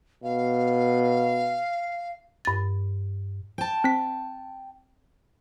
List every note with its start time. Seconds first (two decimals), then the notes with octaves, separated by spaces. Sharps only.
0.23 B2 F5
2.45 G2 A6
3.58 G5 A5
3.84 C4 B6